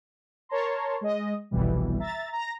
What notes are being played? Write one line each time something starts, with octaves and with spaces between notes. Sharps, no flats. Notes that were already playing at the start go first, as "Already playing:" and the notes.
A#4 C#5 A5 A#5 C6
G#3 D#5
G1 C2 F2 B2 E3 G3
E5 A#5 A6
A#5 A#6